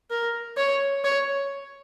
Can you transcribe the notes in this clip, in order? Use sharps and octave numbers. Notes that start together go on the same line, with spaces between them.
A#4
C#5
C#5